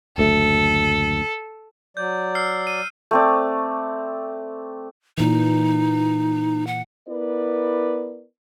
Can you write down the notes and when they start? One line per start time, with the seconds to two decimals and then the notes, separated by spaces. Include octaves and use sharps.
0.18 F#1 D2 A3 A4
1.97 F#3 D5 G6
2.35 E6 F6 C7
2.67 D#7
3.11 A3 C4 D5
5.18 A#2 E3 D#4
6.67 F#5
7.08 B3 E4 A#4 B4 D5